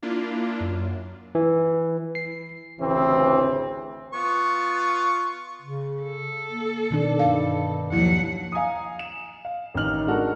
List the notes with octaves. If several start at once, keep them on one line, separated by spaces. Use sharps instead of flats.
A#3 D4 E4 F4
F#2
E3
C7
A1 D2 C#3 E3 C4
B3 F4 C#6
C#3
A4
A#3
B2 D#3 D4
G2 F5
D#2 F3 F#3 E4 F#5
F5 G#5 A#5 D#6
E7
F5
A1 D#3 D#4 F6 F#7
G#3 D4 F#4 A4 A#4